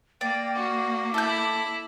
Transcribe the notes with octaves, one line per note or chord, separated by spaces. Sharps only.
A#3 D5 G5
F#4 D6
E4 A4 B5 G6